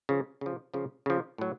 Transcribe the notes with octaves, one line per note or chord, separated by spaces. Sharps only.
C#3 F3
C#3 F3
C#3 F3
C#3 F3
A2 F#3